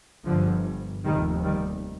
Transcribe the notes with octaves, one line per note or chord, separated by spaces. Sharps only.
G1 G2 D3 F3
F1 D#2 D#3 G3
D#3 G3